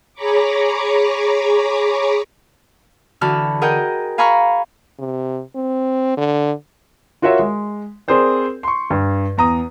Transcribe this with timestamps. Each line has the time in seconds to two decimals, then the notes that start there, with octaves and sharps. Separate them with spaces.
0.14 G#4 C#5 A#5 B5 C#6 D6
3.21 D3 E3 F#4 A5 B5 F6
3.61 G#4 A#4 D#5 F#5 G5 G6
4.18 F5 G#5 A#5 B5 C#6 F6
4.99 C3
5.56 C4
6.17 D3
7.22 F4 F#4 A#4 C#5 E5
7.39 G#3
8.08 C4 G#4 A#4 C5 D5
8.63 C6 C#6
8.90 G2
9.38 E2 A#5 D#6